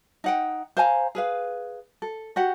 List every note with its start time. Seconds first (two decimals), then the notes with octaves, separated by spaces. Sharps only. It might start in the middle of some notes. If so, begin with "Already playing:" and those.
0.24 D#4 F#5 G5
0.77 C5 F5 G#5 A#5
1.15 G#4 B4 F5
2.02 A4
2.36 F#4 G4 F#5